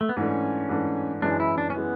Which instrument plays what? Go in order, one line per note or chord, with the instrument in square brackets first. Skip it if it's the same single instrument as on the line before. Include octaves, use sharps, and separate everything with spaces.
[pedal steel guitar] A3
B3
[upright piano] G#2 E3 A3 D4 [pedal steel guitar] C#4
[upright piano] G#2 E3 A3 D4
[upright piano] F#2 E3 G#3 [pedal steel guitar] D4
[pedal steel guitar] E4
D4
C#4
[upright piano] E3 G#3 [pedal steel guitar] B3